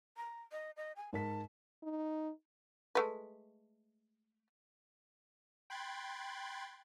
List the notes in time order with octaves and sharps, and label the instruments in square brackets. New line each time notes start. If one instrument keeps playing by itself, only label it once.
[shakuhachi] A#5
D#5
D#5
G#5
[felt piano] G#2 A#4 B6 [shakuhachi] A5
[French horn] D#4
[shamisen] G#3 A3 B4
[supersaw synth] G5 B5 C6 F#6 G#6 A6